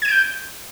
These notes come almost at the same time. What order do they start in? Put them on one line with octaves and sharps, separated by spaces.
G#6 D#7 D7 G6